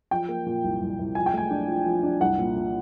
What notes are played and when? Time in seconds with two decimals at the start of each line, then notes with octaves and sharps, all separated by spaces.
0.11 F3 G5
0.29 A#3
0.46 A#2
0.64 C2
0.81 C2
0.99 C2
1.15 F3 G#5
1.26 G5
1.34 A3 G#5
1.50 D4
1.68 F3
1.86 F3
2.03 D4
2.21 C2 F#5
2.38 A#2
2.56 A#2